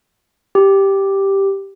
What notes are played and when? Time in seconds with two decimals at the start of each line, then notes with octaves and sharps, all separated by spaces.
0.55 G4